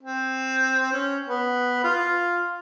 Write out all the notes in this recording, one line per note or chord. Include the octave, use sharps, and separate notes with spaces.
C4
C#4
B3
F4